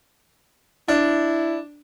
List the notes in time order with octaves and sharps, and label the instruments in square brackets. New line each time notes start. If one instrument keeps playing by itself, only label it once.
[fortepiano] D4 [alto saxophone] E4